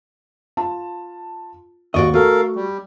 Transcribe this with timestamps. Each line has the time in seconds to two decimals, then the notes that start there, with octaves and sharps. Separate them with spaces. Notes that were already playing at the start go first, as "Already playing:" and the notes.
0.57 F4 A5
1.94 D#2 G#2 F#4 D5 D#5 C#6
2.14 A3 F#4 A4 A#4 F5
2.55 G3